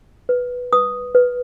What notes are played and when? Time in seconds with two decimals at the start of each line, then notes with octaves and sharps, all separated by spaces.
0.29 B4
0.73 B4 D#6
1.15 B4